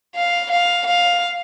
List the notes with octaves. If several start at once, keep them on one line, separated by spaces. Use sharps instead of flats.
F5
F5
F5